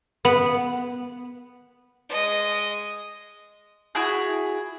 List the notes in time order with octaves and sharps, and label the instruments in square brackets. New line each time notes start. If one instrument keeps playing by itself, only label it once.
[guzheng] B3
[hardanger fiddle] G#3 D#5
[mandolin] E4 F#4 G#4